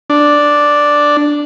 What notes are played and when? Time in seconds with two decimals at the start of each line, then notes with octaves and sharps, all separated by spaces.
0.10 D4